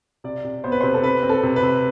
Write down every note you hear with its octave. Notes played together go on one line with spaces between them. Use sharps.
C3 D5
C3
B3 C5
B4
C3 C5
A4
C4 B4
C4
A4
C3
B4
C3